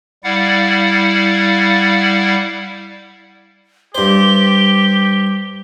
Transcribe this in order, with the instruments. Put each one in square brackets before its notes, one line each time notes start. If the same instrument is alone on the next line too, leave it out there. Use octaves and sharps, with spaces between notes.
[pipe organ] G3 E4 D5 F5 F#5
[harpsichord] G2 C5 [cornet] G4 [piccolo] G7